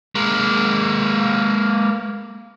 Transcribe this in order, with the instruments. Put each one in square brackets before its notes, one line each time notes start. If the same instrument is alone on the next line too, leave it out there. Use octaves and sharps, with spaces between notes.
[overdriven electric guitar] G#3 A#3